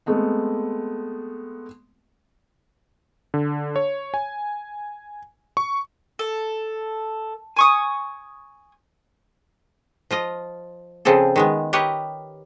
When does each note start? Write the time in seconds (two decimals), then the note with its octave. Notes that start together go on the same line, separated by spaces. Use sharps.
0.06 G#3 A3 B3 C4
3.34 D3
3.76 C#5
4.14 G#5
5.57 C#6
6.19 A4
7.56 G#5 C#6 D#6
10.11 F3 F4 D#5
11.05 C#3 F3 C4 G#4 A4
11.36 D#3 G#3 B3
11.73 G4 A#4 B4 C#5 D#5